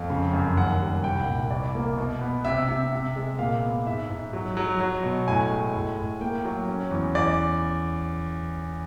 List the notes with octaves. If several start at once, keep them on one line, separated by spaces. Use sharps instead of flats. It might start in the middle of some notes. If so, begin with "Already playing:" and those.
Already playing: F2 F5
C#3
F#2
D#2 F#5
G3
C2 G5
F#5
A#2
C2 D5
A#3
B2
B3
C3 E5
C3
C3
G#3
A#2 F5
B3
G#2 E5
G#2
F#3
F#3
F#3
B2
A2 G#5
G#3
A2
A2
A#3 G5
F#3
C#4
E2
E2 D5